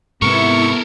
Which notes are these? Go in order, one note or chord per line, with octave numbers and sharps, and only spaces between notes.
G#2 C3 B3 E4 A4 A#4 C#6